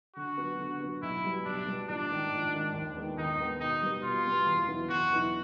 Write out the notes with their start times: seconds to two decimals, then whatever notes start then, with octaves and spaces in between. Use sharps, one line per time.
0.15 D3 F#4
0.37 F#3 B3
0.58 D3
0.80 F#3 B3
1.02 B1 E4
1.23 B2 G3 B3
1.45 B1 D4
1.66 B2 G3 B3
1.89 A#1 D4
2.10 G#2 D#3
2.32 A#1
2.53 G#2 D#3
2.74 D#2
2.96 D#3 G#3 B3
3.17 D#2 D#4
3.38 D#3 G#3 B3
3.60 B2 D#4
3.82 G3 B3
4.03 B2 F4
4.25 G3 B3
4.46 E2
4.68 B2 F#3 B3 E4
4.89 E2 F#4
5.11 B2 F#3 B3 E4